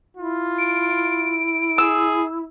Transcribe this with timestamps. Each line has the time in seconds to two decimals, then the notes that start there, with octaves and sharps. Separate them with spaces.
0.17 E4 F4
0.58 D7
1.78 G#4 E6